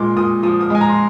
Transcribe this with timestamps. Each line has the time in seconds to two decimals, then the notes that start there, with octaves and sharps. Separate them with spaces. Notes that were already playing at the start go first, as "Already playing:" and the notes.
Already playing: A#2 G#3 C6 D6
0.17 A#2 D#6
0.43 F3 D#6
0.61 D#6
0.70 G#3 G#5
0.81 A#5
0.89 C6